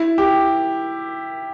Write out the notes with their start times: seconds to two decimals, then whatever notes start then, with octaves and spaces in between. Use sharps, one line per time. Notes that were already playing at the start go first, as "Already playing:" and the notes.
Already playing: E4
0.18 G4